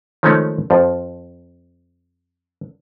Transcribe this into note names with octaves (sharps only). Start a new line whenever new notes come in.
D#3 F3 G#3 A3 C#4 D#4
F2 F3